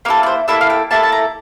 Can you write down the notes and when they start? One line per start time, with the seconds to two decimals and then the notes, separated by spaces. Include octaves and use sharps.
0.05 A#3 A#4
0.08 E4 A4
0.23 D5
0.26 C5
0.48 A#3 E4 A4 E5
0.61 F5
0.70 G5
0.91 A#3 E4 A4 A5
1.03 A5
1.12 A#5